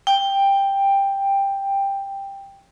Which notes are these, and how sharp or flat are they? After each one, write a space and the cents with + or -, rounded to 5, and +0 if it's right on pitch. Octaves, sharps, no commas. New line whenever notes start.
G5 +10